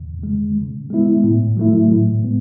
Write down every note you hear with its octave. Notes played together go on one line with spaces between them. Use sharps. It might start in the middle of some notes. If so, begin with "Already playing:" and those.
Already playing: E2
C#3 G#3
C#3
G#3 B3 E4
A2
F#3 A3 E4
A2
G#3 B3